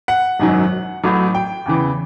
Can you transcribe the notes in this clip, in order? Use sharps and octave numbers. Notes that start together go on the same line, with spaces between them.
F#5
G#1 F#2 D#3 F#3
A1 A2 F#3
G5
E2 C#3 E3